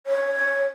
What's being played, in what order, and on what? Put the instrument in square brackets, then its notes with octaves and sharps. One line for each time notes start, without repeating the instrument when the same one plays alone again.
[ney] C#5